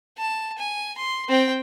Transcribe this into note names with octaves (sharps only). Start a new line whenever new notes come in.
A5
G#5
C6
C4 G5